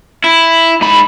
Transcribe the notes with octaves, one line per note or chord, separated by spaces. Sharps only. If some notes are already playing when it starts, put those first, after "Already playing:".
E4
G#2 B5